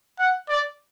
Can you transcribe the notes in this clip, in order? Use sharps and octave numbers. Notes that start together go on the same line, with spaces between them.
F#5
D5